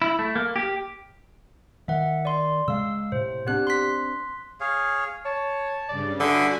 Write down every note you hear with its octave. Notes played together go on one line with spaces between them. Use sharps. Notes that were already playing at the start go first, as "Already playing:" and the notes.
E4
A3
A#3
G4
D#3 E5 F#5
D5 C6
C#3 G#3 F5 E6
A2 C3 C5
B3 C4 D4 G4 F#6
C6 F#6 B6
G#4 C#5 F5
C#5 A5
G2 C#3 D5
D3 F#4 G#4 B4 E5 G#5 D6